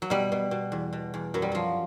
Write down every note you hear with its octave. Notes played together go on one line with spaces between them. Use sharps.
F#3
B2 G3
B2
B2
E2
B2
E2
F#2 F#3
G3
F3 F#3